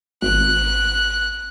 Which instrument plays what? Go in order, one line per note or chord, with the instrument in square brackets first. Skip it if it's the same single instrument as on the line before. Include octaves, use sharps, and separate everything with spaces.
[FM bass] G#1 [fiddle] F#6